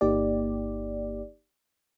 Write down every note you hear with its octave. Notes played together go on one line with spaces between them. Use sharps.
G1 A#3 D#4 G4 D5